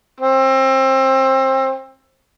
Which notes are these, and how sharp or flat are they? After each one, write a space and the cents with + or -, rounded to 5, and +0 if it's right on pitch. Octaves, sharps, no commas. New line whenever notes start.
C4 +25